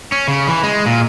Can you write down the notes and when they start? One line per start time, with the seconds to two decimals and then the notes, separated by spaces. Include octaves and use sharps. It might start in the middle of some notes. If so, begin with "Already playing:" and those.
0.12 C#4
0.28 C#3
0.47 E3
0.63 G#3
0.86 A#2